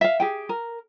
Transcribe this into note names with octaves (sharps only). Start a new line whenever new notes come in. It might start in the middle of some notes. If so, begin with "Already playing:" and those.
E5 F5
G4 G#4 G5
A#4